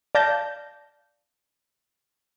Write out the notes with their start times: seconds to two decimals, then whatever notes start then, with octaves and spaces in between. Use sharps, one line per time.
0.15 D5 F5 A5 G6 A#6